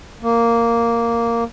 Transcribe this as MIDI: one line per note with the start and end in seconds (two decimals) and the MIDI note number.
0.22 1.44 58